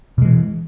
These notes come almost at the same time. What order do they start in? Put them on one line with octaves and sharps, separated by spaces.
B2 G#3 E3